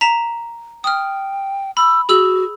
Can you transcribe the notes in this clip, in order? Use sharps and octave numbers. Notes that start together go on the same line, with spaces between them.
A#5 B6 E7
G5 D#6 F6
B5 E6
F#4 G#4 E6 F#7